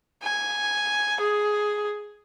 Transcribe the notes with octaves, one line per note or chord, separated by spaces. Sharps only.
G#5
G#4